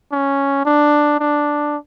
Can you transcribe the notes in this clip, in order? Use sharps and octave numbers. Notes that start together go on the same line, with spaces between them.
C#4
D4
D4